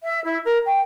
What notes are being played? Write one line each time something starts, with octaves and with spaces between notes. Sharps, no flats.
E5
E4
A#4
G5